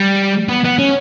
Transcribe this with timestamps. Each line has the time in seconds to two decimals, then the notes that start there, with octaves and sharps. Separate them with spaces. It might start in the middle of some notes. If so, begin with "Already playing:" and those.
Already playing: G3
0.49 B3
0.64 B3
0.79 C#4